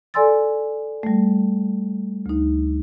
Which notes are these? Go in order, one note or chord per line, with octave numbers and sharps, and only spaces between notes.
A4 D5 G#5 C6 E6 A6
G3 A3
D2 D#4